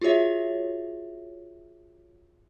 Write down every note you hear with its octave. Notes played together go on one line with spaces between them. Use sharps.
F4 F#4 G#4 C#5 E5